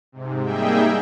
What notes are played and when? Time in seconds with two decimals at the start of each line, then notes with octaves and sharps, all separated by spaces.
0.12 G#2 C3
0.42 G3 A#3 D#4 G#4 E5 G5